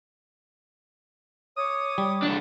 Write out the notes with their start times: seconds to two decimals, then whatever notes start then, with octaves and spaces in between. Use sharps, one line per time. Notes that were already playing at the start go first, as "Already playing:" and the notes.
1.56 C#5 D6 D#6
1.98 G3
2.22 C2 D4